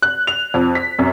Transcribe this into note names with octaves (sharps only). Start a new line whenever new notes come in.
F#6
F7
F2
B6
F#2